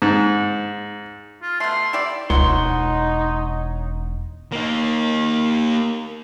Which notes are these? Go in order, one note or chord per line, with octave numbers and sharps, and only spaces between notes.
G#2
F4
B2 A3 C6
E4 G4 D5
E1 C#2 D#4 C#5 F#5 C6
A#3 D#4